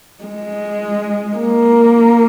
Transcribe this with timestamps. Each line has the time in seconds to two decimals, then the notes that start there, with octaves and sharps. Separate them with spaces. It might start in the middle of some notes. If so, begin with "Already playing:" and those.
0.24 G#3
1.37 A#3